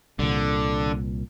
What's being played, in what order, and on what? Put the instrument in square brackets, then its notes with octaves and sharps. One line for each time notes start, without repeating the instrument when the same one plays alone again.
[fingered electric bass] C2 A#2 [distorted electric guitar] D3